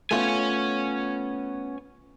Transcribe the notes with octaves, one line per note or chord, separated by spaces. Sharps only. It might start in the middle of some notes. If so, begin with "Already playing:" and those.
A3 B3 C#4 F4 G#5